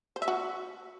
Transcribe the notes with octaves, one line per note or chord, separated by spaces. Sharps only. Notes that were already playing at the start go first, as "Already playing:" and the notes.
C5
E5
F#4